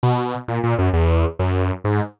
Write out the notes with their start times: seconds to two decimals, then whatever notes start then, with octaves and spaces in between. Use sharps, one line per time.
0.03 B2
0.48 A#2
0.63 A#2
0.79 F#2
0.93 E2
1.39 F#2
1.84 G#2